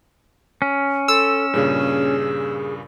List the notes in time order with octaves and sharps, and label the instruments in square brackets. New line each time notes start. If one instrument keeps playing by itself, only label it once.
[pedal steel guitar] C#4
[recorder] A4 [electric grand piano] C6 [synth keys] E6
[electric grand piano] G2 A#2 C#3 [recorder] G#4